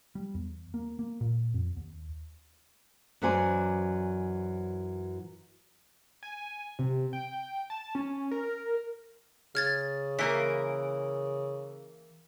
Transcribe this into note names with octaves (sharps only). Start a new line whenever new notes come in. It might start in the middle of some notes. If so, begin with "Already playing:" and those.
G3
E2
A#3
A#3
A#2
F2
D#2
F#2 E3 F#3 C5 D5 G#5
G#5
C3
G5
A5
C#4
A#4
C#3 F6 G#6 A6
E3 A#3 A#4 B6